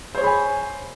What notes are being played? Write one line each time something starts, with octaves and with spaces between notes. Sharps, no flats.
G#4 C5 C#5 G#5 B5